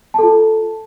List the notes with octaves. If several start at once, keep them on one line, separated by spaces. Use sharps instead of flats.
F4 A4 A5